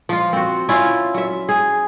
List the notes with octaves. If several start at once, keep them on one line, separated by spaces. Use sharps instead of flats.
F3 F4
C4 F#4
C#4 E4 F4
F#3 E5
G#4